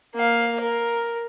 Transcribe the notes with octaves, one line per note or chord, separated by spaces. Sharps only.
A#3 F5
A#4